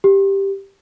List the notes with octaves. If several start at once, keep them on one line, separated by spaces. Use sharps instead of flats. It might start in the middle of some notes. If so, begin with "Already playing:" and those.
G4